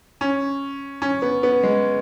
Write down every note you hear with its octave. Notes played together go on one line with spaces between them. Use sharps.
C#4
C#4
B3
B3
G#3